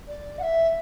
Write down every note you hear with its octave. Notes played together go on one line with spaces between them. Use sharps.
D5
F#5
E5